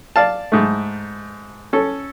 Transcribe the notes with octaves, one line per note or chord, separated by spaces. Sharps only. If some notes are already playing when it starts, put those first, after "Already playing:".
D5 F5 A5
G#2 A3
C#4 A4